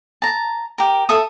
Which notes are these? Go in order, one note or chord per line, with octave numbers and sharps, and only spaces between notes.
A5 A#5
G4 A#4
A4 E5 D#6